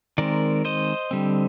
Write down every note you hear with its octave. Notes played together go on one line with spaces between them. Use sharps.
D#3 G#3 C4 A#4 D5
C5 D#5
D3 G3 C4